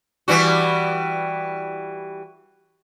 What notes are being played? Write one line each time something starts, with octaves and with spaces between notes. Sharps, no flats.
E3 G3 F#4